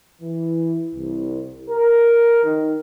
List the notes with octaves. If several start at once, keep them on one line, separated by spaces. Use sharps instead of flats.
E3
C2
A#4
D#3